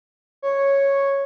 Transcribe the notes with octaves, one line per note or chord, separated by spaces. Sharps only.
C#5